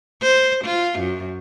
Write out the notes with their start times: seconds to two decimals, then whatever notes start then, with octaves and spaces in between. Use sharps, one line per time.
0.22 C5
0.65 F4
0.99 F#2